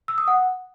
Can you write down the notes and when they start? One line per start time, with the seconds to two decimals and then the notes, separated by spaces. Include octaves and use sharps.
0.08 E6
0.18 D#6
0.28 F#5